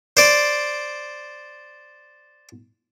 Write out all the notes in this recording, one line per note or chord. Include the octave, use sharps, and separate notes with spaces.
C5 D5